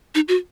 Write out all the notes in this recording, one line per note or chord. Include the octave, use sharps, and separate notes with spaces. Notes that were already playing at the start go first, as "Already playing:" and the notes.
D#4
F#4